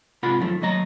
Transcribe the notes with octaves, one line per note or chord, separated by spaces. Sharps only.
G#2 C3 F4 A#4 F#5 B5
F#2 D#3 F3 A3
D#2 F#3 A3 D#5 A#5